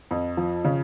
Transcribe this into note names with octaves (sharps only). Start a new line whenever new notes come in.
F2
F3
C#3